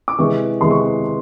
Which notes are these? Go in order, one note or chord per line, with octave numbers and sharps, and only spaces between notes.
D6
C3 E3 G#3 C#6
C3 E3 G#3 C6
C#6